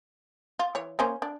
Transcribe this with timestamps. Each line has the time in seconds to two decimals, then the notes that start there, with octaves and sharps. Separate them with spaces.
0.59 F4
0.75 E3 C#5
0.99 A#3 C#4 C5
1.22 D4